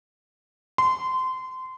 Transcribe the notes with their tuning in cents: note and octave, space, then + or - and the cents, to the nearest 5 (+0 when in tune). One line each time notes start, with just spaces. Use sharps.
C6 -25